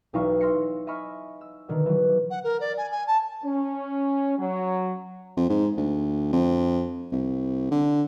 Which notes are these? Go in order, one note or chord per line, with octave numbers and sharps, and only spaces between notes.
E1 B1 D#4 E4 F5 C#6
C6 E6 F6 A#6 C7 C#7
D#5 E5 G#5 B5 C#6 F6
E6
B2 D3 D#3
E3 F#3
F#5
A#4
D5
G#5
G#5
A5
C#4
F#3
F2
G#2
D2
F2
C2
D3